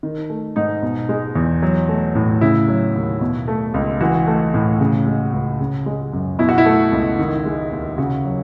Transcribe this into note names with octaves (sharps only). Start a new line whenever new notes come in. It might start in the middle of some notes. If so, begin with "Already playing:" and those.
D#3
A3
G#2 D#4
B2
G#3
E2
F#3
A3
A2
C#3 E4
F#3
D#2
B2
A3
C#2
E3 F#4
A3
A2
C#3
G#3
C#2
C#3
G#3
F#2
B2 E4
F#4
E4
A3
C#2
D#3
G#3
D#2
C#3 F#4
F#3